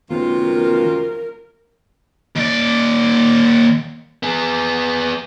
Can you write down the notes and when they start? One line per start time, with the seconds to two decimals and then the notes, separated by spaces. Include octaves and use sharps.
0.10 F#2 C3 D#3 A3 B3 F4
0.44 A#4
2.36 D#2 D5
4.23 B3 G#4